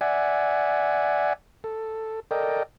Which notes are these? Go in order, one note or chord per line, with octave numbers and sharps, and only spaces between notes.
D5 E5 F#5 G#5
A4
A4 A#4 D5 D#5 G5